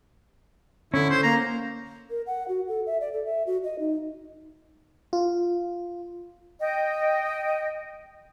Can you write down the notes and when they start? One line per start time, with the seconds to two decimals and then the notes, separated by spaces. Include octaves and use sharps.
0.94 D3 C#4 E4
1.10 C5
1.23 A#3 A#5
2.10 A#4
2.27 F#5
2.48 F#4
2.68 A4
2.86 E5
3.01 D5
3.13 A4
3.25 E5
3.47 F#4
3.64 D#5
3.79 D#4
5.13 F4
6.61 D#5 G5